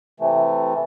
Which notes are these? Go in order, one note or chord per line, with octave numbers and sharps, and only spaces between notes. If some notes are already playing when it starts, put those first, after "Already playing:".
C3 E3 A3